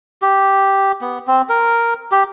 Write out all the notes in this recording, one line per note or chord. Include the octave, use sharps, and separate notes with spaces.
G4
B3
C4
A#4
G4